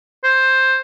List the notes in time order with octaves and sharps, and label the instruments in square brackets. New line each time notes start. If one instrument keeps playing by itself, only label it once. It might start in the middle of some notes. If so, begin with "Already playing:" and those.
[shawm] C5